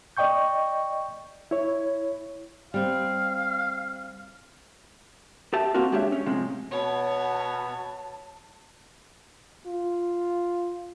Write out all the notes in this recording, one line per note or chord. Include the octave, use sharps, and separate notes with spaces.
D5 D#5 G5 C#6 G6
E4 C#5
G3 C4 F5
G4 E5 A5
A#3 C4 F4 F#4 A#4
G#3 D4 G4 C#5 E5
C#4
A2 C3 F3 G#3
B2 B3 C#5 A5
F4